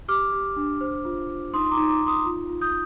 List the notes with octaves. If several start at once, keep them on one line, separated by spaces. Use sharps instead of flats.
G4 D6 F6
G4
D4
C5
F4
F4
D#4 C6 D#6
C6
A#5 D6
D#4
A#5 D6
D#4
C6 D#6
F4
F4
D#6 G6